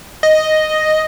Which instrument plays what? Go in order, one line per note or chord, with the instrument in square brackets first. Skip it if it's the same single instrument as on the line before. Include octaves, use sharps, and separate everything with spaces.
[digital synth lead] D#5